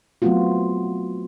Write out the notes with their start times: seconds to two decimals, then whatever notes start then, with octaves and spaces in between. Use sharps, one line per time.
0.22 F#3 A3 B3 C4 F4 F#4